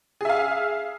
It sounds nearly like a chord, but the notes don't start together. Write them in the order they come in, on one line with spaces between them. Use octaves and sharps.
G#4 E5 F5